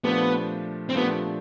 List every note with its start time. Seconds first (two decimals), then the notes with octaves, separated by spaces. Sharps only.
0.04 A#2 F3 A3 B3 D4 G4
0.89 C4
0.95 A#2 F3 A3 B3 D4 G4